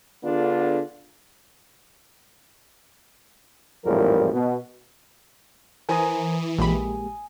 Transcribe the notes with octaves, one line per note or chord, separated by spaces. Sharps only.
D3 B3 D4 F4 G#4 A4
G#1 E2 A2 F3 G3 A#4
B2
E3 A#4 C5 G#5 A#5 D#6
A#1 G#3 A#3 G4 B5